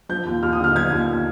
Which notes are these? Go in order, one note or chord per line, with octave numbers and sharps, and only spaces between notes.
F3 G6
D#2
D#2 F6
D#6
D3 F6
F3 G#6
D#2